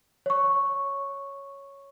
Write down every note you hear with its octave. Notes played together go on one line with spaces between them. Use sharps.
C#5 C#6